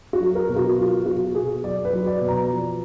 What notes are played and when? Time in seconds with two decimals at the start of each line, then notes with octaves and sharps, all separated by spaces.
0.13 F#4
0.20 F#3
0.35 A#4
0.49 B2
0.56 F#4
0.78 F#3 F4
1.06 B2 F#4
1.35 B2 G#4
1.64 F#3 D5
1.85 B4
1.93 F#3
2.07 D5
2.21 B2
2.28 A#5
2.50 F3